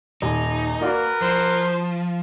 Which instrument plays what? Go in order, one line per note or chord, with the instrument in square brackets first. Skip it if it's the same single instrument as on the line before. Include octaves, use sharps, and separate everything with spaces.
[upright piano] D#1 [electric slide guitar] D#4
[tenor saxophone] A#3 [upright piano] F#4 D5 [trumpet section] A#4 B4
[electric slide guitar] F3 [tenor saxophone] C5